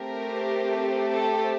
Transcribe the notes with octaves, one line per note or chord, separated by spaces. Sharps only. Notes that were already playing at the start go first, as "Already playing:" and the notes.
Already playing: A3 C4 G4 A#4
A4